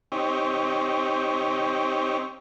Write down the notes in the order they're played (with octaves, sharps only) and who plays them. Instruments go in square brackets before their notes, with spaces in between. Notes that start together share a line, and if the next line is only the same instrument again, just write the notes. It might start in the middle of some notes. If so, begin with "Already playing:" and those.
[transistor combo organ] C4 D#4 G4 C#5